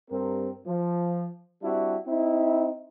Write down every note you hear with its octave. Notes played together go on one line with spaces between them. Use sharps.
G2 C4 A#4
F3
G3 C4 D4 E4 F#4 G4
C4 D#4 E4